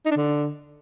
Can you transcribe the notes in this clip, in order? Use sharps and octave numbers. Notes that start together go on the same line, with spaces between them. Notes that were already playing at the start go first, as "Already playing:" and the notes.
D#4
D4
D3